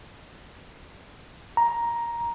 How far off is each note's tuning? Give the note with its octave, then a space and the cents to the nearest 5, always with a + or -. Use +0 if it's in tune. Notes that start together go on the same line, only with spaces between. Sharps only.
A#5 +10